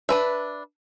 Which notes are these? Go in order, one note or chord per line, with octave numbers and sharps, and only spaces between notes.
D4 B4 E5